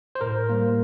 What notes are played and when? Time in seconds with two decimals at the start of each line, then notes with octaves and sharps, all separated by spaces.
0.15 C5
0.21 A2 A#4
0.49 G3 A#3